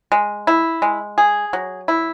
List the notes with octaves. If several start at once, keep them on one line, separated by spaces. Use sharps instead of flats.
G#3
E4
G#3
G#4
F#3
E4